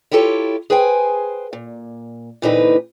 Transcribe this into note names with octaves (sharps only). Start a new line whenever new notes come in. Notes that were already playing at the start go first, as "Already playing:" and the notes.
E4 F4 G4 A4 B4 C#5
G#4 B4 C5 G5 G#5
A#2
A#2 D3 E3 C4 D#4 B4